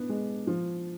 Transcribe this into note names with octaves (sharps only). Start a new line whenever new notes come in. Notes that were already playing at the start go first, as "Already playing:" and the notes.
Already playing: B3 D4
G#3
F3